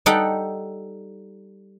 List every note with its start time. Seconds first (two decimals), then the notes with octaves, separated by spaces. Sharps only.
0.06 G3 D#4 A4 F#5 G5